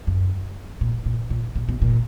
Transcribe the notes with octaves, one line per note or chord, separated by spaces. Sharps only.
F#2
A#2
A#2
A#2
A#2
B2
A#2